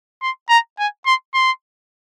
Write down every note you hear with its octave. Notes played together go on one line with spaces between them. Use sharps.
C6
A#5
G#5
C6
C6